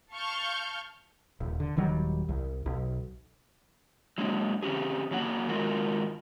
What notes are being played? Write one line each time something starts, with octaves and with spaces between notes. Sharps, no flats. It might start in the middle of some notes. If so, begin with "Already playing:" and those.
F5 A5 C#6 F6 G6
D#1
D3
D#1 D#3 F#3 G3
C2
B1
F#3 G#3 A#3 D4
D3 C#4 G4 G#4
E2 F#3 A#3 F#5
D#3 G#3 F4 F#4 A#4